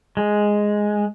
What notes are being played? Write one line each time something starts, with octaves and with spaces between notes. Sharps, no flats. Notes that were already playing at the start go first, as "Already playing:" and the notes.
G#3